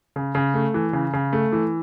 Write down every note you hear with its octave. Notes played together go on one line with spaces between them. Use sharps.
C#3
C#3
A3
E3
C#3
C#3
A3
E3